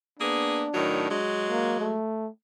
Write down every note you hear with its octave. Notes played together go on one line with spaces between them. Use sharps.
A#3 B3 D4 G#4
A2 D#3 F#3
F#3 G#3
A#3
A3